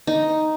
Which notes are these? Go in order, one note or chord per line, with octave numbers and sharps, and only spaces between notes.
D#4